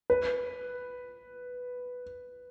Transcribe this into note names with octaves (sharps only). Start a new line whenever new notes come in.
B4